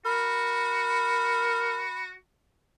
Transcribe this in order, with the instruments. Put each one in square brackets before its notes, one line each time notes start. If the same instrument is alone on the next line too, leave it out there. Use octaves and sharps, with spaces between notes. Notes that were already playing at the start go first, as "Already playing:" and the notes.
[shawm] F#4 [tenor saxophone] A#4 [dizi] B5